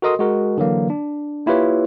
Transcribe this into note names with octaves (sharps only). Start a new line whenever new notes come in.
F#4 A4 A#4 D#5 C6 D#6
G#3 F#4 A#4
D3 E3 F#3 A#3
D4
A#3 E4 F4 G4 B4 C#5